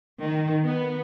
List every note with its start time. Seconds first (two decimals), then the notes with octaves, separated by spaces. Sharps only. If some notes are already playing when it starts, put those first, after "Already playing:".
0.23 D#3
0.64 B3